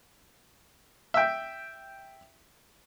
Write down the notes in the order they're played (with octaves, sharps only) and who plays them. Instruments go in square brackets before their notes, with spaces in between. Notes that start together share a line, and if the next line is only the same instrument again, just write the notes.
[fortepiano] E5 G5